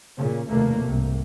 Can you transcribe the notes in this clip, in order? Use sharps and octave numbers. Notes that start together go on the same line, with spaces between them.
A#2 C#3
F1 D#2 B2 A3 A#3
C2 G#2 C3